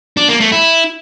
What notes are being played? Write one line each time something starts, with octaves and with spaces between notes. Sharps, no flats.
D4
A#3
A3
E4